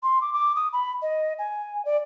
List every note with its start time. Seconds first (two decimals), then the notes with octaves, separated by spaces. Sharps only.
0.03 C6
0.21 D6
0.33 D6
0.56 D#6
0.73 B5
1.02 D#5
1.39 G#5
1.85 D5